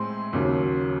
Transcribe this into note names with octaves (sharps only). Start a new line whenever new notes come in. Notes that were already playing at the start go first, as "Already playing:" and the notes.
Already playing: A2 G#3 C4 C6
D#2 C#3 F#3